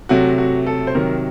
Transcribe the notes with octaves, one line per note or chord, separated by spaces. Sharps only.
C3 F#3 A3 F#4
F#4
A4
C5
C3 D#3 F#3 A#4